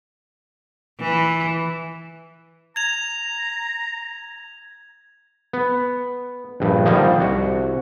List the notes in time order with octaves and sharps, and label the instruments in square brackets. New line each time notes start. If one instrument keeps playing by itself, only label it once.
[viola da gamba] E3
[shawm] A#5 [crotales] G#6 F7
[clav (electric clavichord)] B3
A#1 G2
D3 D#3 F3 G3 A#3 D#4
C2 F#4